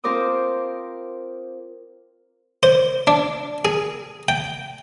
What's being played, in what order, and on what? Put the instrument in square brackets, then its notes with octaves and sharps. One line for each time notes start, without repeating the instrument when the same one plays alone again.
[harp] C4 F4 A#4 C5 D6 D#6
[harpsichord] C5
D4
G#4
G5